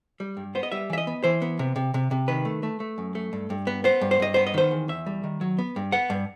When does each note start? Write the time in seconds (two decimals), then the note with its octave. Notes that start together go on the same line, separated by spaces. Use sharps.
0.20 G3
0.37 G2
0.55 B3 C5
0.63 D#5
0.72 G3 E5
0.90 E3 E5
0.98 D#5
1.07 B3
1.24 E3 C5
1.42 B3
1.59 C3
1.76 C3
1.94 C3
2.11 C3
2.28 D#3 B4
2.45 A3
2.63 A3
2.80 A3
2.98 F#2
3.15 A3
3.33 G2
3.50 G2
3.67 B3
3.84 B3 C5
4.01 G2
4.11 C5
4.20 G2 D#5
4.34 B3 C5
4.47 D#5
4.54 D#3 C5
4.71 E2
4.88 E2 E5
5.06 G3
5.24 D#3
5.41 F#3
5.59 B3
5.76 G2
5.92 B3 F#5
6.10 G2